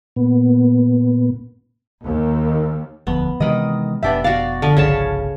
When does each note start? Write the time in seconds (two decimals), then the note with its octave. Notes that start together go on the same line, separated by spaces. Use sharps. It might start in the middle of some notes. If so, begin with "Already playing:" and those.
0.16 A#2 B3
2.05 D#2
3.07 E1 D2 F3 B3
3.40 C3 D#3 E3 G#3 D#5
4.03 F1 B2 B3 D4 G4 E5
4.24 F#4 D5 F5
4.62 D3 F3
4.77 G1 C2 C#3 C#5 A5